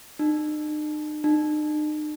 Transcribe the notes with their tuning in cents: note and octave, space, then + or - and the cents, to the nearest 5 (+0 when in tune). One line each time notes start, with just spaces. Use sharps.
D#4 -45
D#4 -45